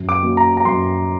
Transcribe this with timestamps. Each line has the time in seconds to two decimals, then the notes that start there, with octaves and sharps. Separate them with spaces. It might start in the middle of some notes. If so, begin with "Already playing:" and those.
Already playing: F#2
0.09 D6
0.23 F#3 A#3
0.37 A#5
0.57 A#5
0.65 F#2 C6